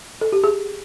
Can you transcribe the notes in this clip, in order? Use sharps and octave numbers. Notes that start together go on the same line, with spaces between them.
A4
G4
G#4